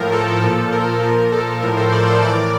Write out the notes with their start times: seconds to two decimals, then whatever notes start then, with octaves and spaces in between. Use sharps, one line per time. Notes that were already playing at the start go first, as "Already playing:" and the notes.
Already playing: A2 F3 A#4
0.12 A4
0.42 A#2 F3 A4
0.72 A#4
1.03 A#2 F3 A#4
1.32 A4
1.62 A2 F3 A#4
1.77 A4 C5
1.92 A#4 D5
2.07 A4 C5
2.22 A2 E3 A#4 D5